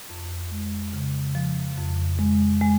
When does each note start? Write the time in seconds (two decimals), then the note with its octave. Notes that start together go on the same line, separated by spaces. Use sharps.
0.10 F2
0.51 G#3
0.93 C#3
1.35 F3
1.77 F2
2.19 G#3
2.61 G#3